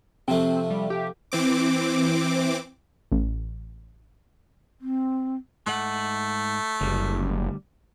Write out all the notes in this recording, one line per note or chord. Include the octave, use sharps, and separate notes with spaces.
C3 F3 A3 C4
G3
G4
E3 C4 D6
A1
C4
G#2 A3 F#5
F#1 D2 G3